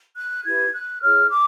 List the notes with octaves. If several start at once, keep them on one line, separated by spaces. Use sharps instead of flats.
F#6
E4 G4 B4 G#6
F#6
E4 G#4 C#5 F6
D6